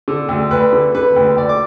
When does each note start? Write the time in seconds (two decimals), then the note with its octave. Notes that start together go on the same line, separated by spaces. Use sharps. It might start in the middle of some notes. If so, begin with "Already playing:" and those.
0.08 D3
0.29 D2
0.51 D2 B4
0.73 D3
0.94 D3 B4
1.16 D2
1.37 D2 D5
1.49 D6